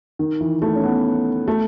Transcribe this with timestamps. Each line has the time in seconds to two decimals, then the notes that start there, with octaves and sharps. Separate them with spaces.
0.19 D#3
0.41 E3
0.62 A3
0.76 C#4
0.84 B3
1.48 A3